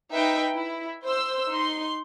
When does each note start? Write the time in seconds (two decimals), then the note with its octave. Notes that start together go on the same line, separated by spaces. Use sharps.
0.14 D#4 B4 E5 G5
0.54 E4
1.05 C5 C6 E6
1.48 D#4 C6